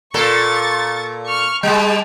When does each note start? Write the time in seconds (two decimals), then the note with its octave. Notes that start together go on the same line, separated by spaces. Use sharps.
0.14 A#2 A4 C#6 A6
1.26 C#6 F6
1.63 G3 G#3 G5 A5